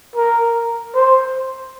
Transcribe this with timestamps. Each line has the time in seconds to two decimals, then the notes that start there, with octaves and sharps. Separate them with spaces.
0.16 A#4
0.95 C5